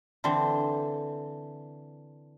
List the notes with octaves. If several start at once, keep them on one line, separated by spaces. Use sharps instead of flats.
D3 E3 C4 C5